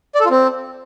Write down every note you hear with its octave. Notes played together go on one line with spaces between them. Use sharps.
D5
A4
F4
C4